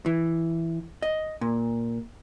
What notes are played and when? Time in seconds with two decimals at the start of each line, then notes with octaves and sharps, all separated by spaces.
0.06 E3
1.02 D#5
1.41 A#2